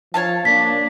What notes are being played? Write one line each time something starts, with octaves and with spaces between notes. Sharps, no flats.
F3 C#5 F5 A5
A#3 D4 B6